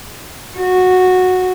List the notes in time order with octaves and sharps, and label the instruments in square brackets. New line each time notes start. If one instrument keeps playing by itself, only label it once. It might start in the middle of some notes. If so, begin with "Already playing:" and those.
[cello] F#4